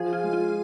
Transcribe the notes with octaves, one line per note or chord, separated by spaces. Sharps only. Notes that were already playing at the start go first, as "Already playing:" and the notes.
Already playing: F3 G#4
F4
G#3
F4